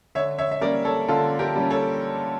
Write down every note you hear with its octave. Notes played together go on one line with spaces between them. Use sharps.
D3 C#5 E5
C#5 E5
E5
G3 A#3 C#4 A#4 D5
A4 C#5
D3 F4 A4
G4 A#4
G3 A#3 C#4
A4 C#5